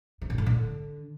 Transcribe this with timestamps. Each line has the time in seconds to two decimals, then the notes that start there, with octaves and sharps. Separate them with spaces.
0.22 C3
0.30 A#2
0.38 A2
0.46 D3